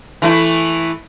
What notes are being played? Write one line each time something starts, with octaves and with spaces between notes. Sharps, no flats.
E3 A3 E4